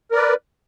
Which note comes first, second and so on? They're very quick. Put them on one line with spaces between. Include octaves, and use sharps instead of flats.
A#4 D5 B4